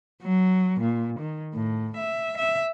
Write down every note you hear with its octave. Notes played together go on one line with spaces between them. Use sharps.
F#3
A#2
D#3
A2
E5
E5